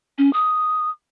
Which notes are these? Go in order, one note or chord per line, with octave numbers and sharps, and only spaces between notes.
C#4
D#6